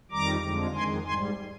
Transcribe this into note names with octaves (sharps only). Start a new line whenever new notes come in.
F2 D#3 G3 A#5 D6
F2 D3 F3 G#3
F2 D#3 G#3 G#5 C6
G#2 G3 G#5 C6